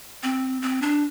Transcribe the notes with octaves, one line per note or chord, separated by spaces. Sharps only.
C4
C4
D4